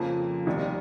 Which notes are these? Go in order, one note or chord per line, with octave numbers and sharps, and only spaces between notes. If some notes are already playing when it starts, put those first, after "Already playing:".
Already playing: F2 C#3 F3 A#3
F1 D#2 D#3 G3